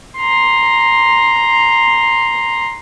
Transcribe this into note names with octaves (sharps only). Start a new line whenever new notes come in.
A#5 C6